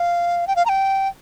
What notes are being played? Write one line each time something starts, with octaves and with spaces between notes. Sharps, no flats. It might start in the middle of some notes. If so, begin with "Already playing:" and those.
Already playing: F5
G5
F5
A#5
G5